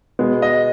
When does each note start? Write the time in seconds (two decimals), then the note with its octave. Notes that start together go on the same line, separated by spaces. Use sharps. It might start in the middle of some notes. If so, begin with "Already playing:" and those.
0.19 B2 G#3 B3
0.42 D#5